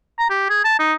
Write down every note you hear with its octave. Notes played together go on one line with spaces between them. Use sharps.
A#5
G4
G#4
A5
D#4